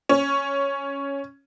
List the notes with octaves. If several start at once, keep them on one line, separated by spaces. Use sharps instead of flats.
C#4